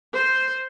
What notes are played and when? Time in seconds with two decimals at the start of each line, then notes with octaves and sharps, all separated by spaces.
0.14 C5